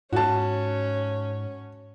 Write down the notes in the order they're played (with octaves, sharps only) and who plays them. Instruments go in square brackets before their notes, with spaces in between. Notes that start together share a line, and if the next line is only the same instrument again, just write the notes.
[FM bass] G#2 [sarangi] C#4 [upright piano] F#4 A5